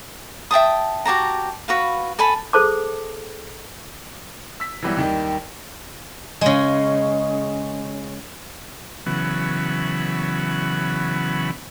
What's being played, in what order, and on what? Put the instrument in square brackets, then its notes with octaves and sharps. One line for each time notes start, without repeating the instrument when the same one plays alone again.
[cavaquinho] E5 G5 A5 D#6
F#4 G4 A5 A#5
F#4 B4 F5
A4 G#5 A5 B5
[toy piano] G#4 A4 C5 A5 D6
[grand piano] E6 B6
E3 F#3 G3 B3 E4
D#2 D#3 G3
[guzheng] C#3 G#3
[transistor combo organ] C#3 E3 F#3 B3